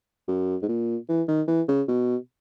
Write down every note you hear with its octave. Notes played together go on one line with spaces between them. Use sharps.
F#2
G#2
A#2
E3
D#3
E3
C#3
B2